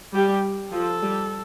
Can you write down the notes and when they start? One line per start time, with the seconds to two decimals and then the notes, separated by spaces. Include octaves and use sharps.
0.14 G3 G4
0.72 F3 A4
1.03 G3